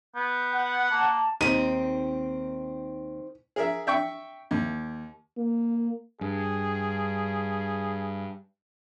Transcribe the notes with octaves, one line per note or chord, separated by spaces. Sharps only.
B3 G6
F#5
A#3 A5
D#2 D#3 C4 D#4 D#7
G#4 A#4 E5
E5 G5 C#6
D#2
A#3
G2 G#4